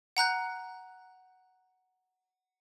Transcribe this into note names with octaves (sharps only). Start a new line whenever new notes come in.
F#5 A#5 F#6 G6